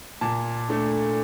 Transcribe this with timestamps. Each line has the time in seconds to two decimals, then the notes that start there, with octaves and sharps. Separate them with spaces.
0.21 A#2 A5
0.69 A3 D4